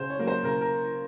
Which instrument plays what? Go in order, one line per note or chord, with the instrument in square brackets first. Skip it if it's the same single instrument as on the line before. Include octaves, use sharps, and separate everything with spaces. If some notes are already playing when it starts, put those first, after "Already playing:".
Already playing: [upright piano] C#3 C5
C#5
F#3 A#3
C5
C#3 A#4
A#4